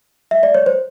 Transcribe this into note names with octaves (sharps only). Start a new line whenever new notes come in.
E5
D5
C#5
C5